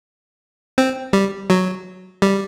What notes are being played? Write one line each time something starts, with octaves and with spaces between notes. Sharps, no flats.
C4
G3
F#3
G3